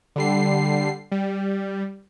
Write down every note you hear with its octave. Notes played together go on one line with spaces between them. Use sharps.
D3 G3 C7
G3